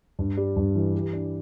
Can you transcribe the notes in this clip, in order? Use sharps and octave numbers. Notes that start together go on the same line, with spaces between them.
G2
G3
G2
E3
G4
D4